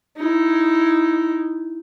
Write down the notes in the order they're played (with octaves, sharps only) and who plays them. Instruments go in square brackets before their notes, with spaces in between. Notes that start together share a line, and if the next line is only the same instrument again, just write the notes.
[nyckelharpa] D#4 E4